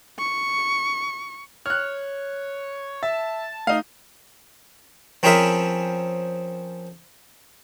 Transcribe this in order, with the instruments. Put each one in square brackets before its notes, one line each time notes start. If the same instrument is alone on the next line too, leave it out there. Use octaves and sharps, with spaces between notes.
[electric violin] C#6
[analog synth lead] C#5 [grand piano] F6 F#6
[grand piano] E5 [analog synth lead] A5
[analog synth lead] A3 [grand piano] D#4 F5
[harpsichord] F3 C4 C#4 G#4 A#4 E5